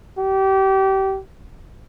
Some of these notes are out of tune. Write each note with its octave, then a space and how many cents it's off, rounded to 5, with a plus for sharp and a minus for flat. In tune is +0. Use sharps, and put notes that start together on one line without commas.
G4 -30